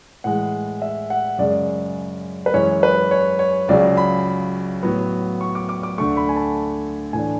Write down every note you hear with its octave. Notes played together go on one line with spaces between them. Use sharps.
A2 E3 G#3 F#5
E5
F#5
F#2 C#3 G#3 D5
B4
F#2 E3 G#3 C#4 C#5
B4
C#5
C#5
C#2 C#3 F#3 D5
B5
A2 F#3 B3
C#6
D6
D6
D6
D2 D3 A3 C#6
B5
G#5
A5
A2 E3 A3 D4 G#5